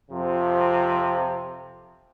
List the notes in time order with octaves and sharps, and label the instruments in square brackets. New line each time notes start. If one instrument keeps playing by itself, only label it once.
[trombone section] F2 C3 F3